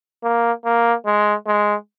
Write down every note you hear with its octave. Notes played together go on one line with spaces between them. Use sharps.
A#3
A#3
G#3
G#3